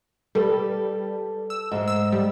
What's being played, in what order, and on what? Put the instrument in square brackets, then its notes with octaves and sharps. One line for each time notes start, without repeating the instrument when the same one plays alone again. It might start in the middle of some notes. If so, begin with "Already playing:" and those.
[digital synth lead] G3 [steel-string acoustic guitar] A4 B4
[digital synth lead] E6
[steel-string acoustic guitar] G#2 G#3
[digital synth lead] E6
G3